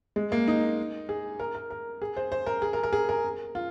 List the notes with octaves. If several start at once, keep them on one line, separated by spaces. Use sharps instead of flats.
G#3
A#3
D#4
G#4
A#4
A#4
A#4
G#4
C5
C5
A#4
G#4
A#4
A#4
G#4
A#4
F4